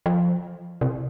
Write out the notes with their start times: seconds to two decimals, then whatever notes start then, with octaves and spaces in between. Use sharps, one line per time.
0.06 F3
0.81 C3